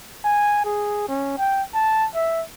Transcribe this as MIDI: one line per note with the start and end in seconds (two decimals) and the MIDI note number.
0.24 0.62 80
0.65 1.07 68
1.08 1.34 61
1.38 1.63 79
1.74 2.07 81
2.15 2.42 76